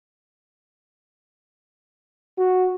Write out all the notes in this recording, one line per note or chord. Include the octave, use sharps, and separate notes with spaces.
F#4